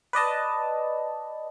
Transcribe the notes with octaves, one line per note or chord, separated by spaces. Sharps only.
B4 D5 D#5 A5